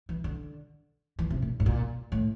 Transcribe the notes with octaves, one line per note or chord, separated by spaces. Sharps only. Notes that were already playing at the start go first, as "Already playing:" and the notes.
E3
D3
E3
C3
A#2
A2
A#2
A2